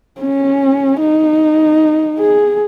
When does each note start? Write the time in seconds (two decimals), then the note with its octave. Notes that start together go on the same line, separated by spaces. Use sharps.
0.21 C#4
1.00 D#4
2.19 G#4